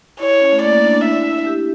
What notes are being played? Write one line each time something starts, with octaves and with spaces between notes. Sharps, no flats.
E4 C#5
C#4
A3
A#3 D5
A#3
D4
D4
E4 E5
G4